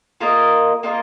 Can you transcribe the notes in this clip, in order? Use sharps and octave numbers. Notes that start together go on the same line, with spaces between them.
A#3 F4 A#4 D#5
A#3 F4 A#4 D#5